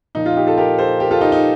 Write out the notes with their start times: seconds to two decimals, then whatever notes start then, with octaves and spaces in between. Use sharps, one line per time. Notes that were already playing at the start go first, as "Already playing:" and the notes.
0.15 A#2 F3 D#4
0.26 F4
0.36 D#4 G4
0.46 F4 A4
0.58 G4 A#4
0.78 A4 C5
1.00 G4 A#4
1.11 F4 A4
1.21 D#4 G4
1.32 D#4